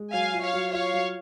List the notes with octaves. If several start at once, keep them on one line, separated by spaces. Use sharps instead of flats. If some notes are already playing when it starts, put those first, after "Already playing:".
Already playing: G#3
F#3 F5 G#5
F4
C#5 F5
F#3
F4 C#5 F5
F#3